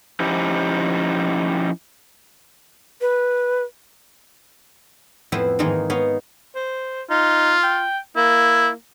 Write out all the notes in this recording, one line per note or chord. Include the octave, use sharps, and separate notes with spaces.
F3 C#4 D#4 E4 G4
B4
F2 A2 B3 E4 B4 C5
G#2 D#3 E3 G#3 A#3 D#4
B3 D#4 C#5 F5
C5
D#4 F4
G5
A#3 E4